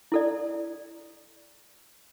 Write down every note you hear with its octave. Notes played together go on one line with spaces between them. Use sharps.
E4 A4 D5